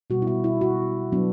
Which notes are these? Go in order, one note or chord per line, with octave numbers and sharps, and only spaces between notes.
B2 G3 B3 F#4
E4
F#4
E4
F#4
F#3 B3 D4